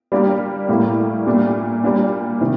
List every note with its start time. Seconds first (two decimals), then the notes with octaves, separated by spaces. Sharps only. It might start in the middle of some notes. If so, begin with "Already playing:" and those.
0.12 G3 A#3 D4 G4
0.69 A2 G3 A#3
1.26 A#2 G3 D4
1.84 A#2 G3 A#3 D4
2.41 C3 D#3